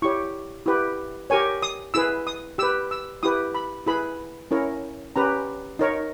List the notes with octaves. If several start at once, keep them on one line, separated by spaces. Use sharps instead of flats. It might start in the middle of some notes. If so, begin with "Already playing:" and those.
E4 G4 C#5 C#6
E4 G4 B4
G4 A#4 C#5 G#5
D#6
E4 G#4 B4 E6
D#6
G4 B4 E6
E6
E4 G4 B4 D#6
B5
E4 G#4 B4 B5
C#4 E4 A#4 C#5
C#4 G4 B4 A#5
D#4 A#4 C#5